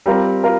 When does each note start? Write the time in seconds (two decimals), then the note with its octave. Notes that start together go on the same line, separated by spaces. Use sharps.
0.06 G3 C4 F4 A#4
0.44 F4 A#4